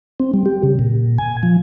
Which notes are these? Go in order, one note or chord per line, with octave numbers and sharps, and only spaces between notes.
C4
G3
G4
C#3
A#2
G#5
F3